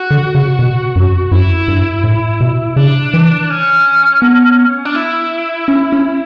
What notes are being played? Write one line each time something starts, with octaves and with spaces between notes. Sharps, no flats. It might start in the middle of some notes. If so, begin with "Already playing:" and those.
Already playing: F#4
D3
C#3
B2
F#2
F#2 E4
G2
A2
B2
C#3 D4
E3
C#4
B3
D4
E4
C#4
C#4